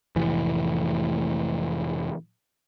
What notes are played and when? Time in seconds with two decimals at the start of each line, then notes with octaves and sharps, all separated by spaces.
0.16 F1 A2 E3